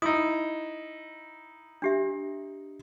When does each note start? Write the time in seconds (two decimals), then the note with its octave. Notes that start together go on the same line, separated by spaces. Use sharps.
0.02 D#4 E4 D#6
1.82 D4 G4 E5